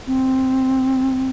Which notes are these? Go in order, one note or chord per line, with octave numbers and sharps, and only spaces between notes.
C4